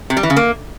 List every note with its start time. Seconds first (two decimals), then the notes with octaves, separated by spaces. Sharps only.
0.10 C3
0.17 G3
0.23 E3
0.30 C#3
0.36 A#3